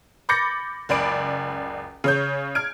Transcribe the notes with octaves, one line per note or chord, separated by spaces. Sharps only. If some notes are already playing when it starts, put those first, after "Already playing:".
B5 D6 G6 A6 A#6 C#7
F#1 C#2 D5 B5 D7
C#3 C#5 G6
F6 G#6 D7